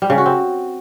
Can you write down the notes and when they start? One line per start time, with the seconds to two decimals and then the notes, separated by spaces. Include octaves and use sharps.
0.02 G3
0.10 C#3
0.18 F#4
0.26 C4